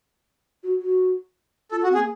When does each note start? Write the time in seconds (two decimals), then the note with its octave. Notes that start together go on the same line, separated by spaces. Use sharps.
0.63 F#4
0.81 F#4
1.71 F4 A4
1.83 F#4
1.90 C4
1.94 G#4
1.97 A#3